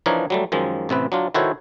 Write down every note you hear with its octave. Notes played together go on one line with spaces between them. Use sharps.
E3 F3 D4 D#4 A#4 C#5
F#3 G3 A3
F#2 D#3 F3 G#3
A1 C3 C4 B4
F#3 D4 F4
D#3 E4 F#4 A4 C5 C#5